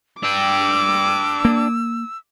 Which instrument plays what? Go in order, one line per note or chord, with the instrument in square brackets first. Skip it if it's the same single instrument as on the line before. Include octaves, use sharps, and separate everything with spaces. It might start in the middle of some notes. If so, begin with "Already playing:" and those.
[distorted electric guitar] D4 G5 [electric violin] D6 [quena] E6
[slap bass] A#3